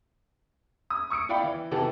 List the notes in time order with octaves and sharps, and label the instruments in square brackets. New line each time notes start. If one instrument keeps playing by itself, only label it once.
[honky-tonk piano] D#6
C#6 D#6 C#7 D7
E4 D5 F5 G5 B5
E3
C3 D#3 E3 B3 F#4 A4